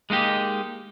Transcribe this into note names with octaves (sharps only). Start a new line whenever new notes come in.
G#3 A#3 D#4 G4